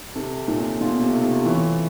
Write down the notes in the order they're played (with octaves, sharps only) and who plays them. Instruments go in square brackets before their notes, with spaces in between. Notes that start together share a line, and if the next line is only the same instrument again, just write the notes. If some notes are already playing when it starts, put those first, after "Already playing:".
[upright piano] C3 [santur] A4
[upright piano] A#2 [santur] C#4
[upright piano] B2 [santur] F4
[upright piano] C3
[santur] A3
[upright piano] C3
[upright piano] E3 [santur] C#5